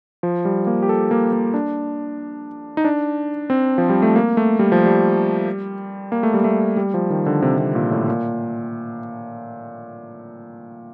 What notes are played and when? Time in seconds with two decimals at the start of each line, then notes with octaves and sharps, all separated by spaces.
0.23 F3
0.45 G3
0.67 A#3
0.83 G4
0.89 A4
1.11 A#3
1.33 A#3
1.54 D4
2.77 D#4
2.85 D4
3.50 C4
3.78 F3
3.89 G3
4.02 A3
4.16 A#3
4.37 A3
4.59 G3
4.72 F3
4.86 G3
6.12 A#3
6.23 A3
6.34 G3
6.44 A3
6.77 G3
6.94 F3
7.10 D#3
7.26 D3
7.42 C3
7.58 C3
7.75 A#2
7.91 A2
8.08 A#2